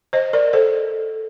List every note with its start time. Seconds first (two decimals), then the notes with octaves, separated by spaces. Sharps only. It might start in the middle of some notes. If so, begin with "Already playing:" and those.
0.13 C5 D#5
0.33 A#4 D5
0.53 A4 C5